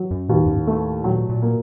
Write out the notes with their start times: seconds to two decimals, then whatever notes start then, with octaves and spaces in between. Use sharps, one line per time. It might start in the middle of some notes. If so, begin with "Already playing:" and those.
Already playing: F#3
0.11 F#2
0.28 D#2 A#2
0.37 A2
0.46 F#2
0.55 A2
0.67 A3
1.04 A#2 F#3
1.29 A#2
1.42 A#3